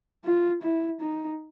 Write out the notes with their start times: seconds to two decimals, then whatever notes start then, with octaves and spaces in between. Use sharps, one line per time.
0.24 F4
0.63 E4
1.01 D#4